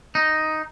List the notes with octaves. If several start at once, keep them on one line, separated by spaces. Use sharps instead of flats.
D#4